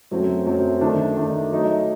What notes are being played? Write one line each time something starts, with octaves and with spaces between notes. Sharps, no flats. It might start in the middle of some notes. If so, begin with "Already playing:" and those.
F#2 F#3 A3 C4 F#4
F#2 F#3 A3 C4 F#4
D#3 A3 D4
D#3 A3 D4
F#3 A3 D#4